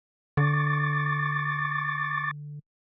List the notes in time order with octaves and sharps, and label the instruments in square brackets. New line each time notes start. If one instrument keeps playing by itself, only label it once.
[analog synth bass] D3 [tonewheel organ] C#6 D6 A6